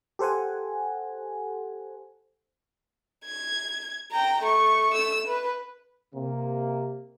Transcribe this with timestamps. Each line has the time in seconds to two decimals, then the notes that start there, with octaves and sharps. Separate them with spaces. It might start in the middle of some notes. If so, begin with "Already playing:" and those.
0.19 G4 A4 C5 F#5 G#5
3.25 G#6
4.11 G5 A#5
4.42 A3 C#6
4.92 A3 E6
5.27 B4
6.15 C3 A#3